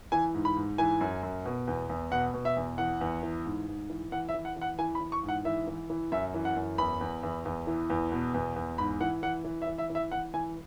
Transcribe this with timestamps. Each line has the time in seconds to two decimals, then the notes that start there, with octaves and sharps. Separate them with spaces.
0.12 E3 G#5
0.34 G#2
0.45 B5
0.56 G#2
0.78 E3 G#5
1.01 F#2
1.23 F#2
1.46 B2
1.67 E2
1.89 E2
2.11 B2 F#5
2.34 B2
2.45 E5
2.57 E2
2.78 E3 F#5
3.01 E2
3.23 E3
3.45 G#2
3.68 G#2
3.90 E3
4.12 E3 F#5
4.29 E5
4.34 E3
4.45 F#5
4.56 E3
4.61 F#5
4.79 E3 G#5
4.95 B5
5.01 E3
5.12 C#6
5.23 G#2
5.29 F#5
5.45 E3 E5
5.67 E3
5.90 E3
6.12 F#2 E5
6.34 E3
6.45 F#5
6.56 F#2
6.78 E2 B5
7.01 E2
7.23 E2
7.45 E2
7.67 E3
7.90 E2
8.12 B2
8.34 E2
8.56 E2
8.78 G#2 B5
9.01 E3 F#5
9.23 E3 F#5
9.45 E3
9.62 E5
9.67 E3
9.78 E5
9.90 E3
9.95 E5
10.12 E3 F#5
10.34 E3 G#5